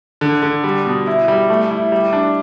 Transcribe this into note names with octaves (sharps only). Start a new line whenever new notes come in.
D3
D3
G3
B2
E4
G3
A3
E4
G3
D4